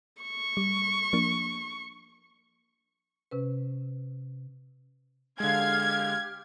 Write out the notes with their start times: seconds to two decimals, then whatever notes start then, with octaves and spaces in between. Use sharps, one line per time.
0.22 C#6
0.57 G3
1.13 F3 A#3 D4
3.31 C3 C#4 B4
5.40 D3 G#3 G4 F5 F6 G#6